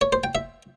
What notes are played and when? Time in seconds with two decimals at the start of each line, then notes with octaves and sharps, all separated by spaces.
0.01 C#5
0.13 C5
0.24 G5
0.35 E5